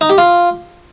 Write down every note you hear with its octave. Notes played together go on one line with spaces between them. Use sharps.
D#4
G4
F4